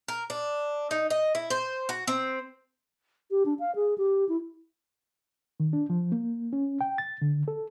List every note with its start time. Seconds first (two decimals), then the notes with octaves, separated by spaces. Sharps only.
0.08 A#4
0.30 D4
0.91 D#4
1.10 D#5
1.35 E4
1.50 C5
1.89 F#4
2.08 C4
3.31 G4
3.45 D4
3.59 F5
3.75 G#4
3.98 G4
4.29 E4
5.60 D#3
5.73 D4
5.90 F3
6.12 A#3
6.53 C#4
6.81 G5
6.98 A6
7.22 D3
7.48 A4